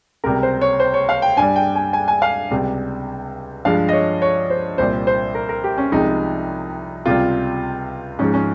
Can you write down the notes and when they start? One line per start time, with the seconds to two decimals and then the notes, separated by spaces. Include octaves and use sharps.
0.24 C#2 C3 G3 A#4
0.43 C5
0.61 C#5
0.80 C5
0.94 C#5
1.09 F5
1.22 G5
1.37 G2 G3 G#5
1.56 G5
1.76 G#5
1.93 G#5
2.08 G#5
2.22 F5
2.50 C#2 C3 G3
3.65 G2 F3 G#3 F5
3.88 D#5
3.93 C#5
4.22 C#5
4.50 C5
4.78 C2 A#2 G3 C5
5.07 C5
5.35 A#4
5.49 A#4
5.64 G4
5.78 C#4
5.92 C2 C3 F3 G#3 D#4
7.06 C#2 C3 G3 F4
8.19 G#2 F3 G#3 C#4
8.34 C#4